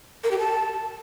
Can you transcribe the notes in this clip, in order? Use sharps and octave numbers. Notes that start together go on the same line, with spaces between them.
A#4
G4
A5